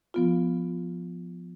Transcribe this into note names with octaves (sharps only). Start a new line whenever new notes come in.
F3 B3 F4